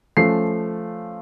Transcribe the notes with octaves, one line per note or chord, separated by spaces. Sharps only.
F3 A3 C#4 C7